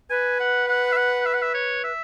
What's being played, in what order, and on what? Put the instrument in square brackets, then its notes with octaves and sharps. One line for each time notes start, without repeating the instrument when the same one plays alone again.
[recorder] B4 [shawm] G#5
[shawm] F#5
F#5
E5
F#5
E5
F#5
E5
C#5
E5